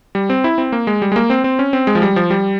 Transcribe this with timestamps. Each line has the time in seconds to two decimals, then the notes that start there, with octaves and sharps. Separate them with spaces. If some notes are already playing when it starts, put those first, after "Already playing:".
0.15 G3
0.30 C4
0.44 E4
0.58 C4
0.72 A#3
0.87 G#3
1.02 G3
1.12 G#3
1.16 A#3
1.30 C4
1.44 C4
1.59 C#4
1.73 C4
1.87 G#3
1.95 F3
2.02 G3
2.16 F3
2.30 G3